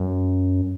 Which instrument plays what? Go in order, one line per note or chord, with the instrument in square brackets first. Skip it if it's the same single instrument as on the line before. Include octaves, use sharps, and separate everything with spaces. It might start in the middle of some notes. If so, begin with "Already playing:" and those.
Already playing: [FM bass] F#2